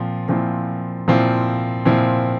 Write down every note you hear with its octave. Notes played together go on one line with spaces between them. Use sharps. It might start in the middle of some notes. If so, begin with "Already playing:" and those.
Already playing: A#2 F3 C4
A#2 F3 C4 E4
A#2 F3 C4 E4
A#2 F3 C4 E4